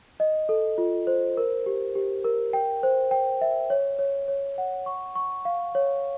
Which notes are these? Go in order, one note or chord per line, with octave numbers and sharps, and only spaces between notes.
D#5
A4
F4
C5
A#4
G4
G4
A#4
G5
C5
G5
E5
C#5
C#5
C#5
F#5
C#6
C#6
F5
C#5